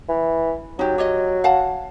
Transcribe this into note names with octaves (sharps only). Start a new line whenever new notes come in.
E3
F#3 D#4 G4
G4 C#5 D#5
F5 F#5 A5